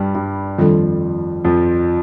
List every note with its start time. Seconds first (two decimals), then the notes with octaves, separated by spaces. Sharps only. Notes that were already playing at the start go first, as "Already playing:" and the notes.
Already playing: G2 G3
0.15 G2 G3
0.58 F2 D#3 F3 G3 D4 A4
1.45 F2 F3